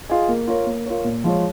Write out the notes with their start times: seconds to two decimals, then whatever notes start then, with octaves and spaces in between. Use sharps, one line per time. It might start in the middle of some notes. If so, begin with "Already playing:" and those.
0.09 F4 G#4 D#5
0.29 A#3
0.47 F4 A#4 C#5
0.66 A#3
0.86 F4 A#4 C#5
1.05 A#2
1.24 F3 G#3 F4 C#5